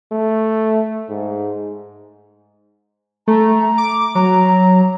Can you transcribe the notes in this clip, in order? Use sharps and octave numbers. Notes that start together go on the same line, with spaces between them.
A3
G#2
A3 A#5
D6
F#3 A#5